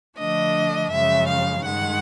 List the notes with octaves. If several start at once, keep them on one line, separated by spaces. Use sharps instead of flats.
D3 F3 A3 D4 D#5
F#2 C#3 F3 G#3 E5
F5
G2 D#3 G#3 F#5